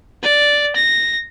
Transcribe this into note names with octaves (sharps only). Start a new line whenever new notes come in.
D5
A#6